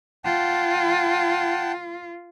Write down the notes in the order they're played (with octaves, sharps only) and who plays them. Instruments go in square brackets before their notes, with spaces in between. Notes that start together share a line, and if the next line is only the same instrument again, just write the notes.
[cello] F4 [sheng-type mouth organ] F#5 G5 A5